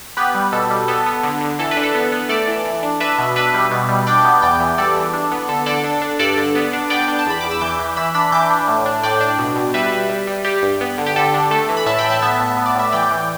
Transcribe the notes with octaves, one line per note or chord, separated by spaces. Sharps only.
B3 G4 B4
G3
B2 A4
G3
B3 A4
B3
D3
D3
E3 A4
B4
D4
A4
B3
B3
A3 A4 D5
E3
E3
D4
D4 B4 E5
B2
D4 B4 E5
G3
B2
G3
D4 D5 G5
B3
E2 D5 G5
E3
G3 A4 D5
E3
D4
B3
D3 A4
D3 A4 D5
D4
D4
G2 A4 D5
D3
B3
D4
B3 D5 G5
D4
A5
E2 B5
E2 D6
E6
E3 D6 G6
E3
E3 B5 E6
D4 B5 E6
E3 D6 G6
D4
A2
D4
A2 D5 G5
D4
B2
B2
G3 B4 E5
G3
G3
G3
G3 G4
G2
B3
D3
G4
D3 A4
D4
A3 A4
E3
B5
A2 E5 A5
G5 B5
A2
E5 A5
B3 E5 A5
A2
B3
D5
A2 E5
E3 D5 G5
E3